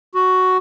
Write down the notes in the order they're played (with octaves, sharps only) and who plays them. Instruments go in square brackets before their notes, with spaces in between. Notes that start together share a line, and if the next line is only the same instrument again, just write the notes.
[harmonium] F#4